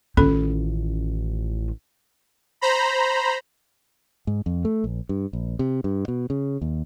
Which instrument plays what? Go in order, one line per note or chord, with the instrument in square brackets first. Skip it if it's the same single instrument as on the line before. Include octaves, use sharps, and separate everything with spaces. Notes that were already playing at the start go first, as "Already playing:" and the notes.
[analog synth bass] A1 [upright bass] D#3 F4 [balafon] C#4 A4
[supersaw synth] C5 A#5 B5
[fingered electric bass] G#2
F2
A3
A#1
G2
A#1
C3
G2
B2
C#3
D#2